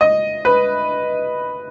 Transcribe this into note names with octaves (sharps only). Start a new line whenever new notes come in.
D#5
B4